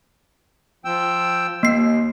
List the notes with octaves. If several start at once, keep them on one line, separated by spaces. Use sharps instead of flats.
F3 G5 E6
D#2 A#3 C7